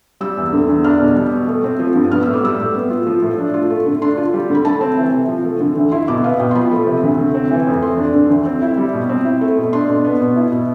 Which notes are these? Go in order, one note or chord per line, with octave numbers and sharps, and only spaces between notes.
G3 E6
E2
D3
E2
D4 F6
B2
G3
B2
A3
C4
F3
G2
B3 F6
A2 E6
D6
G3 E6
A2
B3
F4
F3
A2
D4
F4
A3
D3
D4 C6
F4
G3
D3
B5
A3 A5
C4
E3
C3
F3
A3
D3
D2
E4 C6
B2 D6
B3 F5
B2 G5
C6
F3 B5
A3
C3
D2
A3
C4
E3
F2
A3 C6
D4
D3
D2
C4
E4
G3
B2
C4
E4
A3
B2
D4 C6
B2
B3
B2
E4
B2